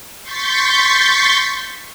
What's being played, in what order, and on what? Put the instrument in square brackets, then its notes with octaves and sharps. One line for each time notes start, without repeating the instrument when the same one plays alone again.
[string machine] C6 C#6 G6 A6 B6